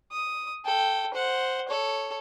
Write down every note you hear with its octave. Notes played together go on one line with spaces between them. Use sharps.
D#6
A4 G5
C5 F#5
A4 C#5